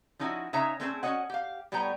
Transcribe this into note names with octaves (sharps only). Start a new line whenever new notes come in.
F3 C#4 D#4 E4 F#4
C#3 D#4 C#5 E5 A#5
A3 C4 C#4 G#4 B4 C5
C#4 F#4 C#5 D#5 F#5
G4 F5
A2 G3 B3 C#5 G5 A#5